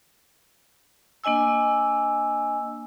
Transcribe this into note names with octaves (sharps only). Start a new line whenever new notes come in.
A#3 D4 D#5 G#5 E6